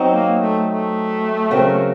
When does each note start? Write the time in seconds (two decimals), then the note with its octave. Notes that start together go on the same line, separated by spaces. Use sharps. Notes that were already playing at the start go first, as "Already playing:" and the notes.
Already playing: F#3 C4 D#4
0.11 A#3
0.39 A3
0.67 A3
1.51 C#3 F#3 C4 F#4 A#4